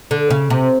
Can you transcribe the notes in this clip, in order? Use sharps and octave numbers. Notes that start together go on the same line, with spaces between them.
D3
C#3
C3